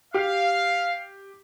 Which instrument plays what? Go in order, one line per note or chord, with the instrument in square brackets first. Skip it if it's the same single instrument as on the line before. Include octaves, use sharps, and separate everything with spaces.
[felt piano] G4 [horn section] F5